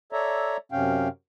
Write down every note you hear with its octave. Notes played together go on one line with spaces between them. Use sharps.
A4 C#5 D5 E5 A#5
F#2 C3 C#4 F5 G5